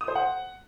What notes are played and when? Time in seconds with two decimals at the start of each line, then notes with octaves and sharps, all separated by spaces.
0.01 D#6
0.08 C5
0.15 F#5